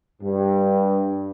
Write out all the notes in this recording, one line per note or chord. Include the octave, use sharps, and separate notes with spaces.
G2